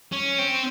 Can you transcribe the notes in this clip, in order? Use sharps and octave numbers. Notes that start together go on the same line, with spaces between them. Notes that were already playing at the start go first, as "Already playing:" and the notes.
C#4
C4